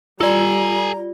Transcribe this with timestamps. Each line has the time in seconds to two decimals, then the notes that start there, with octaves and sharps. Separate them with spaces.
0.21 G3 F4 A4 D5 G#5 A#5